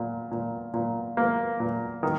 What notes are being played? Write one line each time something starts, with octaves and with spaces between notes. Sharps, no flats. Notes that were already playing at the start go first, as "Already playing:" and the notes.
Already playing: A#2
A#2
A#2
A#3
A#2
D#3